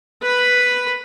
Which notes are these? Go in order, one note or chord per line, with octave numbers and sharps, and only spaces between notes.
B4 B5